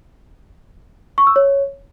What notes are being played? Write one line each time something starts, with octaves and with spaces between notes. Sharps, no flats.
C#6
E6
C#5